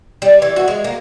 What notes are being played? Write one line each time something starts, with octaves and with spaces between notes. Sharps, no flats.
G3
E3
F#4
G#3
A#3